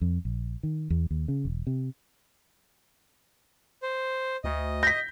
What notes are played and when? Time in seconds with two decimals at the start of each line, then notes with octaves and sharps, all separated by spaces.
0.02 F2
0.25 A#1
0.63 D#3
0.90 E2
1.11 D#2
1.28 C#3
1.45 E1
1.67 C3
3.82 C5
4.44 D2 D#5
4.83 G6 A#6 B6